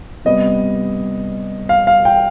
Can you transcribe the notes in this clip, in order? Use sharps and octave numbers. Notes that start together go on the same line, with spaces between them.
C3 G3 B3 D#5
F5
F5
G5